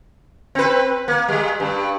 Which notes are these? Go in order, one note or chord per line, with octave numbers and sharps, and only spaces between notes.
C4 B4
A#3
G3 G#3
G2